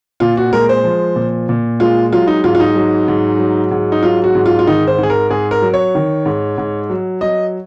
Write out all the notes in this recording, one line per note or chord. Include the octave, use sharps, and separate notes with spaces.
A#2 F4
F#4
G#3 A#4
C5
F3
A#2
A#2
G#3 F4
F#3 F4
D#4
G#2 F4
F4
D#4
F#3
G#2
F#3
G#2
D#4
F#3 F4
F#4
G#2
F4
F4
D#3 D#4
C5
G#2
G#4
A#4
G#2 G#4
A#4
F#3
C#5
D#3
G#2
G#2
F#3
F#3 D#5